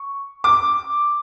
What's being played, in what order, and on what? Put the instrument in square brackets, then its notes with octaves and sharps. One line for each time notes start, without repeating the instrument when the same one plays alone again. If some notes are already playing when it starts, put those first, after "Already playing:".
Already playing: [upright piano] C#6
D6